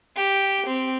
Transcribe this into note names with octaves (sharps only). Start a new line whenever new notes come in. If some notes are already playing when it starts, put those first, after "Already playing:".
G4
C4